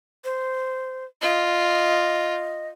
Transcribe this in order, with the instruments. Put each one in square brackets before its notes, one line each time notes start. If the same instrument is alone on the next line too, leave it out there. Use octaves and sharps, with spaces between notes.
[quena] C5
[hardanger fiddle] F4 [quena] D#5